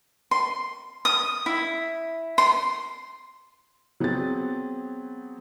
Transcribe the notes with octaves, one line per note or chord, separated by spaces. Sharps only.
C6
D#6
E4
C6
F#3 B3 C4 G#4 A6